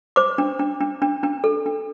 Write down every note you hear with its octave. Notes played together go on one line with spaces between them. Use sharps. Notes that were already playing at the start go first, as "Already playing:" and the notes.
C5 D6
D4
D4
D4
D4
D4
A4
D4